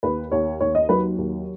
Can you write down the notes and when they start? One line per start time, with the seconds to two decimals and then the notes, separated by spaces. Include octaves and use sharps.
0.03 D#2 B4
0.32 D#2 C#5
0.60 D#2 C#5
0.75 D#5
0.89 F#3 B4
1.18 D#2